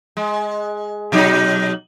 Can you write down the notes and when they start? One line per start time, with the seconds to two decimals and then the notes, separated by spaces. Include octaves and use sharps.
0.17 G#3
1.12 B2 F#3 D#4